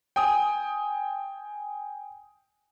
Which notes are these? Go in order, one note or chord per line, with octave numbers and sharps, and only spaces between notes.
G5 G#5 D#6